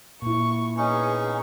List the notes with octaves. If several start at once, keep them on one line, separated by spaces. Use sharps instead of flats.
A#2 E4 C#6
B3 C#4 D#4 G#4 G#5 C#6